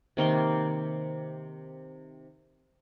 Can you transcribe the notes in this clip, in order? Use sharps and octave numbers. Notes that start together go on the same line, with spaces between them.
C3 D#3 A#3 C6